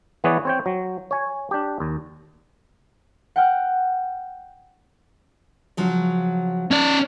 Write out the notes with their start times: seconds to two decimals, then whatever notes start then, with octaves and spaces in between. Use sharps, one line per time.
0.24 E3 B3 G#4 B4 C#5 D5
0.45 C4 C#5 G5
0.66 F#3
1.11 C#5 G#5
1.51 D4 G4
1.80 D#2
3.36 F#5 G5 F6 F#6
5.77 C#3 F3 F#3
6.71 C#4 D5